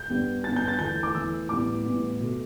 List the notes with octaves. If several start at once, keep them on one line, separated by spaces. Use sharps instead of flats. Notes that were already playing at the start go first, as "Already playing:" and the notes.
Already playing: G6
G2 G3 B3
G2 G3 B3 A6
G6
A6
E2 E3 A3 G6
D6
E2 E3 A3 E6
A2 E3 G3 B3 D6
A2 E3 G3 B3
B2 A3